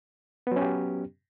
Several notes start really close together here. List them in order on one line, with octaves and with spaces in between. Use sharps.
B3 F#3 C#4 G4